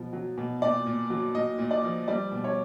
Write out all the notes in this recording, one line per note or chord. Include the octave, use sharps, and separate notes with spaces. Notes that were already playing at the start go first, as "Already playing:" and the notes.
Already playing: B2 F3
F#3
B2
A#2 D5
A#2
F#3
A#2 D#5
A#2
D5
F3
G3 D5
B2
C#5